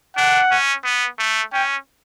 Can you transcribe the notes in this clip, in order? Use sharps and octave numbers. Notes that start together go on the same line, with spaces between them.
D4 F#5
C#4
B3
A3
C#4 G5